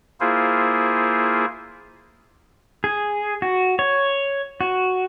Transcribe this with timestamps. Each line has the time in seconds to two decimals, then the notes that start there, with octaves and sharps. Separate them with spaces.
0.20 A#3 E4 F4 G#4 C5
2.84 G#4
3.42 F#4
3.79 C#5
4.61 F#4